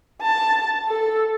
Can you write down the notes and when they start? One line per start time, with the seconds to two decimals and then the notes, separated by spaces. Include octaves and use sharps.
0.22 A5
0.89 A4